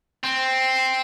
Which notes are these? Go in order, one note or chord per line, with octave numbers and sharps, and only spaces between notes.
C4